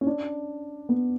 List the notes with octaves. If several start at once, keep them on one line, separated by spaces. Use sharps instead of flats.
C#4
D4
B3